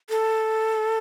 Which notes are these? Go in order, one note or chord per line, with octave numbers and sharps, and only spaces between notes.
A4